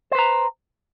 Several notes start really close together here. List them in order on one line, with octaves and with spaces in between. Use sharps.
C5 B4 A#5